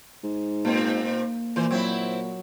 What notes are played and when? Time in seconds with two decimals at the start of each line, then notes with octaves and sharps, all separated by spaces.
0.23 G#2
0.65 A#2 A#3 C4
1.56 A#2 E3 C5
1.71 F#3 C4 E4